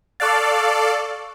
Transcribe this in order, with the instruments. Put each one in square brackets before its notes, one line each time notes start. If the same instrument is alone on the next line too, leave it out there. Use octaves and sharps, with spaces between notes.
[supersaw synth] A4 D5 F5 [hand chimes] C#6 F#6 A6